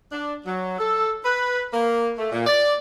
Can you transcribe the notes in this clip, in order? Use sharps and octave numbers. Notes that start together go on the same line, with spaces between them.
D4
F#3
A4
B4
A#3
A3
A#2
D5